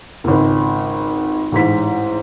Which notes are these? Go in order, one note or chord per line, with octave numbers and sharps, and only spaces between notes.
G#1 C#2
A1 G#2 B6